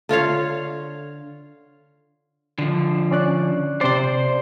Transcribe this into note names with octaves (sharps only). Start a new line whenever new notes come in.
D3 F4 C#5 F5
D3 F3
C#4 D5 F#6
C3 C5 D5 C6